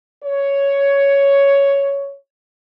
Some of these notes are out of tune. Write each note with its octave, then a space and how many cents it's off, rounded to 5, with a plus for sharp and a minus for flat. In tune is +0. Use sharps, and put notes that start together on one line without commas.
C#5 +5